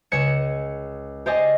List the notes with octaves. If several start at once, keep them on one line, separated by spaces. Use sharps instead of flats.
C#2 G#4 C#5 G#6 C#7 E7
G4 C5 D5 D#5 G5 G#5